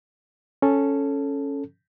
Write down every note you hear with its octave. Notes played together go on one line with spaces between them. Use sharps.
C#4 A4